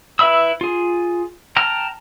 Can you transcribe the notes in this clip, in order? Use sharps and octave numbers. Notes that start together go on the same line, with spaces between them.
E4 B4 E5 B5 E6
F4 G#4
G5 A5 A#5 F6